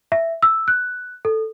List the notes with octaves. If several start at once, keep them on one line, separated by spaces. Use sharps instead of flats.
E5
E6
F#6
A4